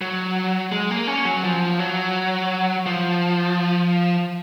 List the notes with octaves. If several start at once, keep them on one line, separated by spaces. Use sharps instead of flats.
F#3
G#3
A#3
C#4
F#3
F3
F#3
F3